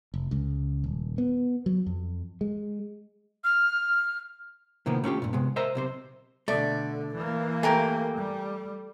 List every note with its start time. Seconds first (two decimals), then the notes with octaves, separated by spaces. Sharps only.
0.14 F1
0.31 C#2
0.84 D#1
1.18 B3
1.66 F#3
1.86 F2
2.41 G#3
3.44 F6
4.86 A2 C3 D#3 F3 A#3 B3
5.04 A3 C#4 F4 G4
5.22 G2 A#2
5.33 C3 G#3 B3
5.56 A#4 C5 D#5 E5 A#5
5.75 B1 C3 C5
6.48 B2 D3 A3 D5
7.15 E3 A#3
7.63 A3 G4 A#4 G#5
8.17 G3